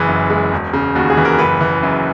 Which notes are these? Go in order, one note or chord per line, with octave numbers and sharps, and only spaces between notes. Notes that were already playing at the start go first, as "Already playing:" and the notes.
Already playing: F#1 E3 G#4
F#2
G#3
E1
C#3
D#2 F#4
G#4
E3
A#4
F#1 B4
E3
F#2